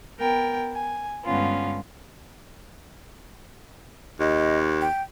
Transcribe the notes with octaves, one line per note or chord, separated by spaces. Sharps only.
B3 A#4 G5
G#5
G2 D3 G#3 B3 C#4 F4
D#2 D#5
G5